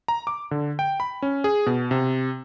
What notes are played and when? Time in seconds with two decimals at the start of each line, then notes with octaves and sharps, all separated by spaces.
0.08 A#5
0.27 D6
0.51 D3
0.79 G5
1.00 B5
1.22 C#4
1.44 G#4
1.66 B2
1.91 C3